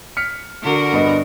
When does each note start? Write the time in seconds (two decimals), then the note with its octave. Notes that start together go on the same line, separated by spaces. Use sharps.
0.17 F6 B6 C#7
0.62 D3 F#4 A#4
0.92 G2 B3 D#5